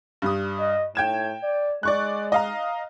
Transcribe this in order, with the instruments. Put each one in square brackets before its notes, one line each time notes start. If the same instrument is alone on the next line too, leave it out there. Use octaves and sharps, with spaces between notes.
[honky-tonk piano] G2 G3 D#6
[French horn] D#5
[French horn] A2 [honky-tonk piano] G5 G#6 E7
[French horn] D5
[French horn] G#3 [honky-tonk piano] D5 C#6 F#6
[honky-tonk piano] D#5 F5 A#5